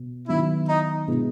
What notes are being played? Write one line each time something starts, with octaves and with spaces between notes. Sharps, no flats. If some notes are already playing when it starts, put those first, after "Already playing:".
Already playing: B2
D#3 F#3 B3 E4
D#4
B2 G#3 B3 E4